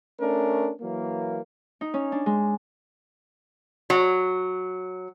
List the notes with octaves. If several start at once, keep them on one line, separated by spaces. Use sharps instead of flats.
A3 C#4 D4 A#4
E3 F#3 A#3
D#4
C#4
D4
G#3
F#3